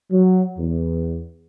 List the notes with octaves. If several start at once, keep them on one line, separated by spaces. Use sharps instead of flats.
F#3
E2